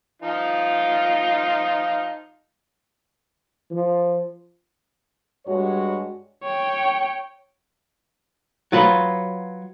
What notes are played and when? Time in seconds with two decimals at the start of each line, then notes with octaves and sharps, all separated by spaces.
0.22 F3 D#4 F4
3.71 F3
5.46 G2 G3 G#3 F#4 C#5
6.43 C#5 G5
8.72 F#3 F4 B4